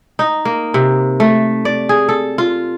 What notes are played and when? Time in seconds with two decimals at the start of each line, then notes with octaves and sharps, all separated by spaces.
0.19 D#4
0.45 A#3
0.74 C3
1.20 A3
1.65 D5
1.89 G#4
2.09 A4
2.38 F4